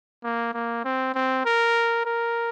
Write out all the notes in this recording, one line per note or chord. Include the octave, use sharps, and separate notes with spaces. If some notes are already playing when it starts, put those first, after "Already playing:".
A#3
A#3
C4
C4
A#4
A#4